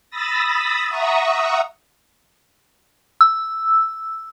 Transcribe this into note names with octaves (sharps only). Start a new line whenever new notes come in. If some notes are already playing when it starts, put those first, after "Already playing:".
B5 D#6 E6 A6 A#6
E5 F#5 A#5 C#6 D#6
E6